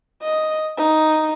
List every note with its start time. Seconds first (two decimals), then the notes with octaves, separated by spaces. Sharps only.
0.22 D#5
0.77 D#4